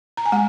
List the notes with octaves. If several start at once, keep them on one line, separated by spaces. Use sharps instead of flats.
A#5
G#5
G#3 F#5